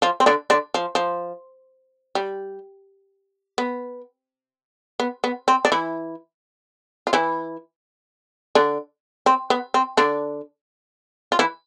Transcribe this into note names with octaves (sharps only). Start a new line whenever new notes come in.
F3 F4
C4
D3 D4
D3 D4
F3
F3
G3
B3
B3
B3
C4
D4
E3 E4
F4
E3 E4
D3 D4
C4
B3
C4
D3 D4
F4
E3 E4